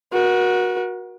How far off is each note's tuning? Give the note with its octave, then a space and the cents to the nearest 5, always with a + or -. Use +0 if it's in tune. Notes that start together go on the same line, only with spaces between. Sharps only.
F#4 -10 A#4 +40